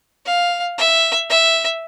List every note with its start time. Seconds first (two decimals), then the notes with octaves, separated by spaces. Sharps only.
0.26 F5
0.78 E5
1.30 E5